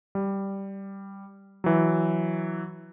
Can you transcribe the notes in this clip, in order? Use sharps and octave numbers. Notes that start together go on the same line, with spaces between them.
G3
E3 F#3